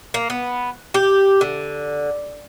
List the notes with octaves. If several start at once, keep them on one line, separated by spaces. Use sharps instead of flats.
A#3
B3
G4
D3